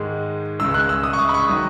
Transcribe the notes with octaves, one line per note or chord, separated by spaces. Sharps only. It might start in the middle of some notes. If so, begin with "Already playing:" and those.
Already playing: G#2 D#3 G#3
C#2 C#3 G#3 E6
F#6
E6
D#6
C#6
D#6
B5
C#6
D#3 F#3 D#6